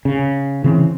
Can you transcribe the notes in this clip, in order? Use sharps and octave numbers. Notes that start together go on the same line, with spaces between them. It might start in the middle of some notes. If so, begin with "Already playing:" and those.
C#3
C#3 E3 C4